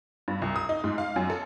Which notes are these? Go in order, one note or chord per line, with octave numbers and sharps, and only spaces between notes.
G2
C2
D#6
D#4
G#2
F5
F#2
A4